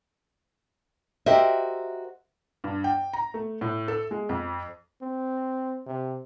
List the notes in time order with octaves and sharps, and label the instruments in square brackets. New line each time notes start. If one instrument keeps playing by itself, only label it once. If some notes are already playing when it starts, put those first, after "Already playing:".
[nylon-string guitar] F#4 G4 A#4 C5 D#5 E5
[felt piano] G2
G5
A#5
A3
A2
A4
G#3
F2
[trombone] C4
C3